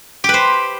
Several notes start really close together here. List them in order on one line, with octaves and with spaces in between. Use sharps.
G4 B4 C5